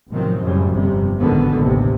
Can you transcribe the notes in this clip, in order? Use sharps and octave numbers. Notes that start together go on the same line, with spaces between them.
A1 C3 D#3 F3 F#3 C4
F#2 A2 C#3 G3
G1 F2 C3 G3
G#1 C#2 B2 D3 D#3 B3
A1 D#2 C3